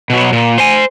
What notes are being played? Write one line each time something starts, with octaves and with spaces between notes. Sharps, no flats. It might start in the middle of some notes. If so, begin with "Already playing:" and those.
B2 F#3
A#2
C5 G#5